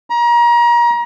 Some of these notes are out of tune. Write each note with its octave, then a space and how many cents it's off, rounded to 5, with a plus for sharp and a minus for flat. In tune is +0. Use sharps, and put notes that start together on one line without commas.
A#5 +30